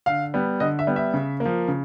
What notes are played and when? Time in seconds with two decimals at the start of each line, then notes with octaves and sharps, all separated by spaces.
0.06 D3 F5
0.34 G3 B3
0.60 D3 D#5
0.79 E5
0.87 G3 B3
0.96 E5
1.14 C#3
1.40 A#3
1.46 F3
1.68 C#3